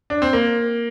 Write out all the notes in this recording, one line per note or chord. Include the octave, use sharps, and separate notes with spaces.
D4
C4
A#3